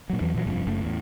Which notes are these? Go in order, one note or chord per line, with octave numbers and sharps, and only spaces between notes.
A#2 F#3
E2 E3 F#3
A#2 E3 F#3
F1 G2 B2 F3
F#1 F#2 A3
E2 A2